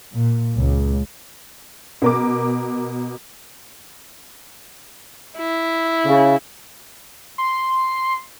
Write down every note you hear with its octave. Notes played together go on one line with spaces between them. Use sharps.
A#2
C#2
B2 A#4 D6
E4
C#3
C6